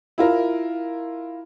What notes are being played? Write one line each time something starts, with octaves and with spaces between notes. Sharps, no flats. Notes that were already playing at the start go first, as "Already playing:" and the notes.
E4 F4 A#4